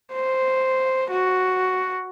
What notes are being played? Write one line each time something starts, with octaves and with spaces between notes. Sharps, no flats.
C5
F#4